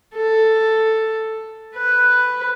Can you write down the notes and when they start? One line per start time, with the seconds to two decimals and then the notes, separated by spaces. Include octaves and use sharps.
0.15 A4
1.76 B4